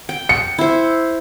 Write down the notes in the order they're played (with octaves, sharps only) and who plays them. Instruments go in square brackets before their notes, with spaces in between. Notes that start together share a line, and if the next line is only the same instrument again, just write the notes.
[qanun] G5
[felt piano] C#7
[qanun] E4 C5